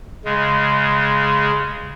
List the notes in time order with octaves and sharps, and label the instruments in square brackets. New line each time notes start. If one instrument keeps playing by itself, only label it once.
[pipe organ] C#3 G#3